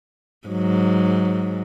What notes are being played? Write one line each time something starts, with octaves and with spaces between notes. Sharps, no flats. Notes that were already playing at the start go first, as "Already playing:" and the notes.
G#2 F#3